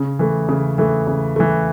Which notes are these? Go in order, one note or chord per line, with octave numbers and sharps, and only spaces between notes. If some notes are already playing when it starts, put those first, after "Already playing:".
Already playing: C#3
E3 A3
C#3
E3 A3
C#3
E3 A3